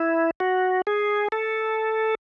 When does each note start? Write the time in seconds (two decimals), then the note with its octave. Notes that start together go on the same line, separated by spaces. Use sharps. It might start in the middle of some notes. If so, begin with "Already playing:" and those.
Already playing: E4
0.40 F#4
0.87 G#4
1.32 A4